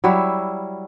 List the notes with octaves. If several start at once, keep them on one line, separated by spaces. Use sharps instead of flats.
F#3 G3 E4 F#4